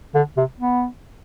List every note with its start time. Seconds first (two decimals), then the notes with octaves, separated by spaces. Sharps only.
0.15 D3
0.37 C3
0.59 B3